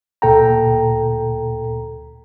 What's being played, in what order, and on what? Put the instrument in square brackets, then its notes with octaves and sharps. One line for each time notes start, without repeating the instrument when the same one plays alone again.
[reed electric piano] D2 A#2 A4 G5 A#5